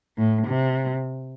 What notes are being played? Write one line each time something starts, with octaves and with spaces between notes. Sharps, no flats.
A2
C3